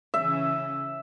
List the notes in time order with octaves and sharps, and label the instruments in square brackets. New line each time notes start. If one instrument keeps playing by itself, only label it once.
[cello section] C#3 E3 C#4 [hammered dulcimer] E5